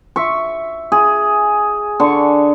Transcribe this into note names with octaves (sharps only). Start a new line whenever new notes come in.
E5 C#6
G#4
D3 C#6